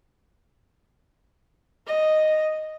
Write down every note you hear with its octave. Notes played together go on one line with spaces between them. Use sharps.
D#5